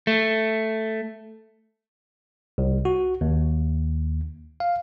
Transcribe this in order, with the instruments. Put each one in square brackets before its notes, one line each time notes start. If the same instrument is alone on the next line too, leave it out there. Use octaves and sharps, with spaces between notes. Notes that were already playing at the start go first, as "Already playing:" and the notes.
[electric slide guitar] A3
[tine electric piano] C2
F#4
D#2
F5